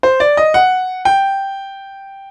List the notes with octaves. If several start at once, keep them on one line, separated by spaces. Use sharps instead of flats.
C5
D5
D#5
F#5
G5